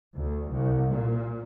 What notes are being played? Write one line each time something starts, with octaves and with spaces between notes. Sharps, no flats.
D2
C2
A#2